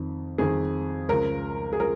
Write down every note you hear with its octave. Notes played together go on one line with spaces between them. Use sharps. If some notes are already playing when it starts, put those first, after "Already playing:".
Already playing: F2 D#3
F2 D#3 G#4
C#2 C#3 F3 A#4
G#4
F3 A#4